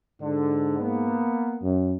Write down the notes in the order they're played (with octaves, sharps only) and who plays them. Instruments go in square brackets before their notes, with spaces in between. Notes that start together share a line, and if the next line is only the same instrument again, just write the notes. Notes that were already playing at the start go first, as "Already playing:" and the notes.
[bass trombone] G#2 [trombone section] D3
[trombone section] A#3 B3
[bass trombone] F#2